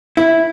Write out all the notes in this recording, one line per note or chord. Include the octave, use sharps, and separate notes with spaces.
E4